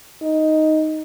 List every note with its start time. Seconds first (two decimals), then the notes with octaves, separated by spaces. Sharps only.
0.22 D#4